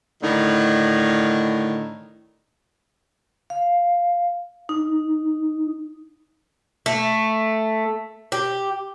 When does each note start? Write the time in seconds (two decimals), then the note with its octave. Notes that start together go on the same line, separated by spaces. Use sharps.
0.21 A2 D3 D#3
3.50 F5
4.69 D#4
6.86 A3
8.32 G4